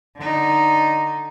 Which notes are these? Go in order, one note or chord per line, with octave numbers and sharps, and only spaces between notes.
D3 D#4